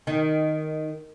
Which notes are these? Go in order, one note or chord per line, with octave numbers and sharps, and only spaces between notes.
D#3